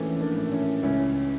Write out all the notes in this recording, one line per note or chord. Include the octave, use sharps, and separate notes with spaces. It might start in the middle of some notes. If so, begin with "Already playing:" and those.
Already playing: A#1 E3 A3 A#3 C#4 D4
A#3 D4
A2
C#4 E4
C#2 C#4 E4